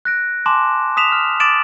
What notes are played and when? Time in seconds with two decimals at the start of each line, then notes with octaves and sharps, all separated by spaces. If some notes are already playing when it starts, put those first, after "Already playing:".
0.05 F#6 A#6 D7
0.46 G#5 A5 C6 D6 E7
0.97 D#6 B6 E7 F7
1.12 F6
1.40 D6 D#6 A6 D7 E7 F#7